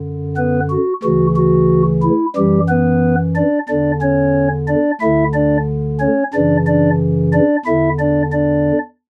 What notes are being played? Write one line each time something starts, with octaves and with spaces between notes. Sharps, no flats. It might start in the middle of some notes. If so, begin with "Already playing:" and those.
Already playing: F#2 D3
B3 B4
F#4
D2 C#3 E3 F#4
F#4
E4
F#2 E3 G3 G4
B3 B4
D4 D5
E2 D3 D4 D5
C#4 C#5
D4 D5
D2 D3 E4 E5
D4 D5
C#4 C#5
F#2 C#3 E3 D4 D5
D4 D5
D4 D5
E2 D3 E4 E5
D4 D5
D4 D5